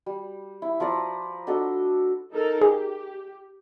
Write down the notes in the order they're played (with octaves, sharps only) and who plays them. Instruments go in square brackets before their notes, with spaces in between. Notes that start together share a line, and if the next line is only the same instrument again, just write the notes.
[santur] G3
E4
F3 B4 D5 A#5
D4 F#4 A4 D#5
[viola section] D#4 A4 A#4
[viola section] G4 [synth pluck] G#4